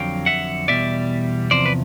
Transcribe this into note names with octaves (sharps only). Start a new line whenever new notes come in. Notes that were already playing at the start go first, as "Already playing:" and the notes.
Already playing: F2 D3 F#3 F5 G5
E5 F#5
E2 B2 G3 D5 E5
E2 C3 F3 C5 D5
B4